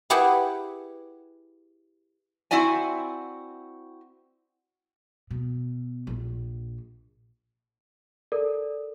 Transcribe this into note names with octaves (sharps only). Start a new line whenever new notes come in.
E4 G4 G#4 B4 F#5
C4 E4 F#4 D5 G#5
B2
A#1
A4 A#4 D5